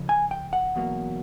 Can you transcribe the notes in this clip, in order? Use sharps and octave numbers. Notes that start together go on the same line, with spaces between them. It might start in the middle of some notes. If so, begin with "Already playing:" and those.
Already playing: F2 C#3
G#5
G5
F#5
E2 B2 F#3 A#3